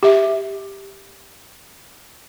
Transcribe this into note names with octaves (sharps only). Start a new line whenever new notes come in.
G4 E5